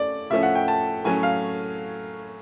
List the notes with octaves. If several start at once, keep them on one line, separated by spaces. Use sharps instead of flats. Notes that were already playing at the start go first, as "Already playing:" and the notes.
Already playing: A3 C#4 D5
A2 F3 A3 C#4 E5
F#5
G5
A5
A2 F#3 A3 C#4 G#5
F5